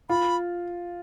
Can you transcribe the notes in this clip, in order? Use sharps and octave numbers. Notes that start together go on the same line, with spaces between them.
F4 B5